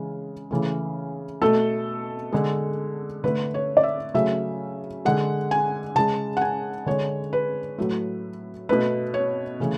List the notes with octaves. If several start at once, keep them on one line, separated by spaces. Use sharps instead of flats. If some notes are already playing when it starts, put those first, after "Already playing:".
Already playing: C#3 E3 G#3
C#3 E3 A3
B2 A3 A4
D3 G#3
D3 A3 B4
C#5
D5
E5
C#3 F#3 A3 E5
D3 G#3 F#5
G#5
C#3 G#3 A5
F#5
G#5
D3 G#3 C#5
B4
A2 F#3 A3
B2 A3 B4
C#5
C#3 E3 A3